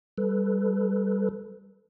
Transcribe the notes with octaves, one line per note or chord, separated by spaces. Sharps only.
G3 A4 B4